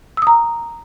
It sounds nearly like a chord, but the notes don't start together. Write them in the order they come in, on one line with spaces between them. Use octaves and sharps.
E6 D#6 A#5